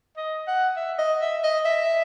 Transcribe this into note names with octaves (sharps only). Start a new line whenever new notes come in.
D#5
F#5
E5
D#5
E5
D#5
E5